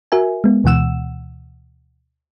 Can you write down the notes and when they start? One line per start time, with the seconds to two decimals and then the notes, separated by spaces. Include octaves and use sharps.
0.12 F#4 A#4 E5 G#5
0.44 G#3 B3
0.64 D2 B2 E3 F#5 E6 E7